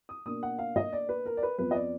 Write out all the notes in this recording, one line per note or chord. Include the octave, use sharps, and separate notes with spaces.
D#6
B2 A#3 D4 D#6
F#5
F5
D#5
D5
B4
A#4
D5
B4
F2 F3 B3 B4
D#5
D5